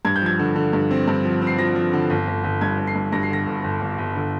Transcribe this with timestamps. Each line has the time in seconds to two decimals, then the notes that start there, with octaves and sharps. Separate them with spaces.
0.05 G2 G#6
0.16 G6
0.22 F3 G#6
0.39 D3
0.56 D3
0.73 G2
0.91 C4
1.08 G2
1.25 F3
1.42 C4
1.47 C7
1.58 F3 A#6
1.76 F3
1.93 D3
2.10 G1
2.27 G1
2.44 G1
2.61 G2 G#6
2.79 G1
2.87 C7
2.95 G2
3.12 G2 A#6
3.23 C7
3.30 D3 A#6
3.47 G1
3.64 G1
3.81 G1
3.98 G1
4.15 D3